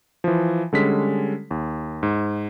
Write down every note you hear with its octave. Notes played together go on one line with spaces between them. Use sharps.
E3 F3
D3 G3 G#3 C#4 A4 B6
D#2
G#2